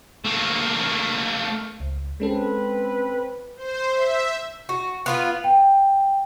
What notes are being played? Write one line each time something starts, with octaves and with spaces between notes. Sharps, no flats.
A3 A#3
C#2
G#3 C4 C#4 A4 B4
C5
E5
F#4
B3 F4 B4
G5